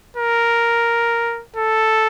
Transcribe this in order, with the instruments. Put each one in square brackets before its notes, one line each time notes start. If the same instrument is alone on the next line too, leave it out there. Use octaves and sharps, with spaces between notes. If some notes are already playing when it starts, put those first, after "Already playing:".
[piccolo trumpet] A#4
A4